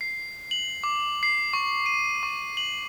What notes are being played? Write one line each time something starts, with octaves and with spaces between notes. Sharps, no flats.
C7
F#7
D6
C7
C#6
D#7
C#6
F#7